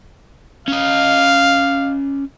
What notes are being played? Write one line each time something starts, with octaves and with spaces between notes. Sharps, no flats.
C#4 D#5 F5